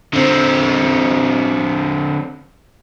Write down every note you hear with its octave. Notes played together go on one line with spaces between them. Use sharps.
D3 C4